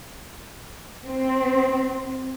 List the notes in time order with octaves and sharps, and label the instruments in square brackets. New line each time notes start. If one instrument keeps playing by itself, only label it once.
[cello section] C4